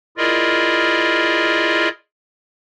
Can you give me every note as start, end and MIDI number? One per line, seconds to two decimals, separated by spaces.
0.17 1.89 64
0.17 1.89 65
0.17 1.89 68
0.17 1.89 70
0.17 1.89 74
0.17 1.89 75